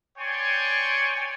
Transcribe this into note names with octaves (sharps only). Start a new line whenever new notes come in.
C#5 D5 G5 G#5 C6 C#6